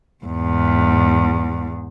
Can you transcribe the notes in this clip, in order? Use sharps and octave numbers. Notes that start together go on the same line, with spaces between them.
E2 G#2